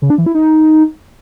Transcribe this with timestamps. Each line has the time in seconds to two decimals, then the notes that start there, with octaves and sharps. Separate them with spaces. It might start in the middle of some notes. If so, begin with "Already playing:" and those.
0.02 C#3
0.10 D4
0.18 E3
0.26 E4
0.35 D#4